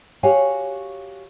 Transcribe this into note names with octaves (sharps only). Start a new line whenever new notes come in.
F#4 G4 C#5 F5 G#5